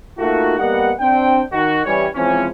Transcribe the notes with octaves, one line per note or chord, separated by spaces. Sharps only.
A3 A#3 D#4 F4 F#4
G3 A#3 B3 G4 D#5 F#5
C4 D4 G5
D#3 F#4
E3 G3 C#4 C#5
E3 F3 G#3 C4 C#4